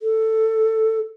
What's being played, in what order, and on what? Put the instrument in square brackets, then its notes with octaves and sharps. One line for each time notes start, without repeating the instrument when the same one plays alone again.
[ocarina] A4